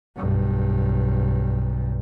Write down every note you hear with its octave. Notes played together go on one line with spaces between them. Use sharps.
B1 G2